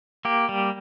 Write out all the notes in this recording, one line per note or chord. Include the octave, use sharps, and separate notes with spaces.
A#3 G4
G3